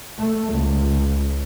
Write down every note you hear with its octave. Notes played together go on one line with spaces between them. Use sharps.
A3
C#2